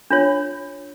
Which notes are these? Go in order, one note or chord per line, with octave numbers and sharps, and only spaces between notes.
D4 F4 C#5